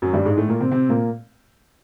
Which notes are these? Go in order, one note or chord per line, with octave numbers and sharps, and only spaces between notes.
F#2 F#3
G2 G3
G#2 G#3
A2 A3
A#2 A#3
C3 C4
C3 C4
A#2 A#3